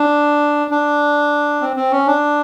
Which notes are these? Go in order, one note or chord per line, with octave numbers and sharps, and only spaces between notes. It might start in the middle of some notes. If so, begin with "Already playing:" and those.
Already playing: D4
D4
C4
C4
C#4
D4